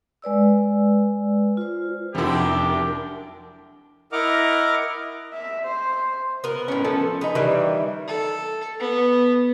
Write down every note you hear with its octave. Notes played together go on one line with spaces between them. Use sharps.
G#3 B4 D5 E6
F4 C5
F1 F#2 D4 E4 G4 A#4
E4 A#4 D#5 F#5 D6 F6
E5
C5
B3 A#4
A2 C#4
F3 C#4 A4
D#4 G#4 B4
D#3 E3 G3
A4
B3